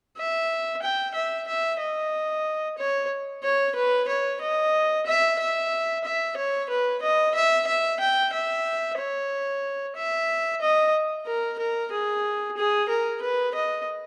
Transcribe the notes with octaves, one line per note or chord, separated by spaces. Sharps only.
E5
G5
E5
E5
D#5
C#5
C#5
B4
C#5
D#5
E5
E5
E5
C#5
B4
D#5
E5
E5
G5
E5
C#5
E5
D#5
A#4
A#4
G#4
G#4
A#4
B4
D#5